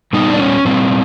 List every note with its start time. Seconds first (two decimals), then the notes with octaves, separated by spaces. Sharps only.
0.13 A#2 G3 B3 D#4
0.30 D4
0.39 C#4
0.65 A#2 G3 B3 C4